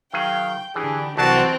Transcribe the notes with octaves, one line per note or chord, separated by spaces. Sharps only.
D#3 F#3 G#4 F5 G5
D3 E3 D4 G4 G#4
C2 E3 F#3 C4 D4 F#4 A5